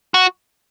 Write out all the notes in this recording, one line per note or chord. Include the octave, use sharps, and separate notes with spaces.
F#4